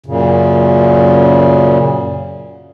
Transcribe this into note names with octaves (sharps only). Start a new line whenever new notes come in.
F#2 A#2 C#3